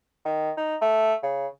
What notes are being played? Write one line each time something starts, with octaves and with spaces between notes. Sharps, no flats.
D#3
D#4
A3
C#3